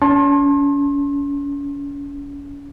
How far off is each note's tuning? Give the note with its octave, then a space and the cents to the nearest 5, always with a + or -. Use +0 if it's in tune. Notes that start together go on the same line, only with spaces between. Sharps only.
C#4 +35 A5 +0 C6 +35